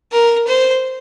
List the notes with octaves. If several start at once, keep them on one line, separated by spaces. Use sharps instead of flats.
A#4
C5